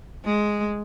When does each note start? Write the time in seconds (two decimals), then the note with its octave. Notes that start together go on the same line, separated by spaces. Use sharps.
0.25 G#3